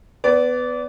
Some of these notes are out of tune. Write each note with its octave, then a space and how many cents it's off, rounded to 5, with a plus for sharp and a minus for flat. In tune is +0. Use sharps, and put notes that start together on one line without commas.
B3 +15 D5 -20